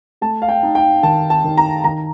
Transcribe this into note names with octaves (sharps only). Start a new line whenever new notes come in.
A3 A5
F5
G5
D#4
G5
D#3 A5
A5
D#3
A#5
D#3 A#5